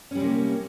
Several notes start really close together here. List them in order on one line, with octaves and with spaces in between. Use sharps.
C#4 G3 C3 A#3